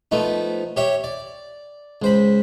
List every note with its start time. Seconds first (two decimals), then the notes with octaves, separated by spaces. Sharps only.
0.11 F3 A3 B3 D#4
0.77 G4 C#5 E5 G5
1.04 D5
2.02 C#2 C5 B5